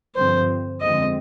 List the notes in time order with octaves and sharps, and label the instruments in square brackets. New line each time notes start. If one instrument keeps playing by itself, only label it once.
[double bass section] G2 D3 F3 C4 [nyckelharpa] C5
[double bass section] F2 D3 G#3 C4 [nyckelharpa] D#5